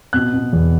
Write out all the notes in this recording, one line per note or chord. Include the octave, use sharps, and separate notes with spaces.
B2 F#6
B2
E2